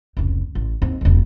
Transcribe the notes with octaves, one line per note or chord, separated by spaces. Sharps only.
F1 C#2
A1
D#2 C4
E1 C#2